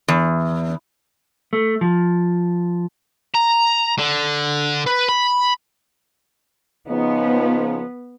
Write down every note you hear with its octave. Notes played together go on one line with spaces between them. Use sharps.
E2
A3
F3
A#5
D3
B4
B5
C#3 F3 B3 D#4